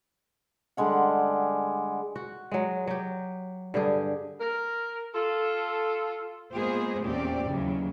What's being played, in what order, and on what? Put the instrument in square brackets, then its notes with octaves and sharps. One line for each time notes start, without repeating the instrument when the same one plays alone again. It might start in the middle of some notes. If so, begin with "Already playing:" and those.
[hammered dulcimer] D3 G3 G#3 F#5
[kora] F#4
F#3 G#3
F#3 G4
G2 D3 G4 G#4
[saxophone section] A#4
F4 A4
[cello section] G#3 A#3 B3 F4 G#4 C5
E2 A#2 C4 C#4 G4 D5
D#2 C#3 E3 F#3